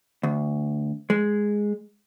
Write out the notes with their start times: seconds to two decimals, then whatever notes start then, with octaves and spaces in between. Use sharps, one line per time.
0.23 D2
1.10 G#3